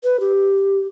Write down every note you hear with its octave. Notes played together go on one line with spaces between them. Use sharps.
B4
G4